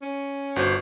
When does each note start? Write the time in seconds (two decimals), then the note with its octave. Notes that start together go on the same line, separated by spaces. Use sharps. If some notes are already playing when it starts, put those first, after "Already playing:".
0.02 C#4
0.56 G1 F#4 C5